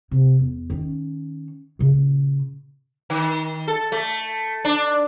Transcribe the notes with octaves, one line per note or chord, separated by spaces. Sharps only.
C3
E2
D#3 C#4
A#2 C#3
D#3
A4
A3
D4